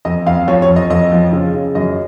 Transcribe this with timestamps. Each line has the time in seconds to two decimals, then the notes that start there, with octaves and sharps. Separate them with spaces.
0.05 F2 D#5
0.26 F2 F5
0.48 F3 C#5
0.62 C#5
0.69 F2
0.76 D#5
0.90 F2 D#5
1.12 F3
1.33 C#3
1.54 C#3
1.75 F#2 D#5